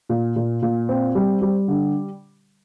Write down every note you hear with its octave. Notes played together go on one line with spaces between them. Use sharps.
A#2
A#2
A#2
C4
G3
G3
D3